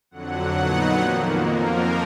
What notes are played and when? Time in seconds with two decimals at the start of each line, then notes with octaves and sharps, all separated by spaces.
0.11 F2 D3 F#3 F#5
0.54 A#2 F#3 B3 D#4
0.98 F2 D#3 A#3
1.40 F2 F3 A#3 A#4